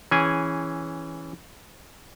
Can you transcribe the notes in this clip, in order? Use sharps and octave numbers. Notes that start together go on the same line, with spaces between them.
E3 C#4 G#4 G#5